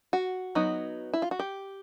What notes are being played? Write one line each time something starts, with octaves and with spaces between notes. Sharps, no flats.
F#4
F#3 B3 D#4
E4
F4
F#4
G4